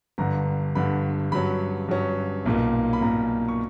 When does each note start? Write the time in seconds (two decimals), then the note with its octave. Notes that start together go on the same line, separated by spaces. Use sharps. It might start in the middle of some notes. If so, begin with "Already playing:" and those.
0.18 G1 G2 D3 A#5
0.75 G1 G2 D3 B5
1.32 G2 F#3 C#4 B5
1.88 G2 F#3 C#4
2.46 B1 A#2 A#3
2.93 B5
3.02 B1 A#2 A#3 A#5
3.48 C#6